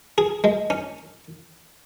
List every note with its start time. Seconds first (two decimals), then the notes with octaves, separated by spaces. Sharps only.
0.18 G#4
0.44 G#3
0.70 C#4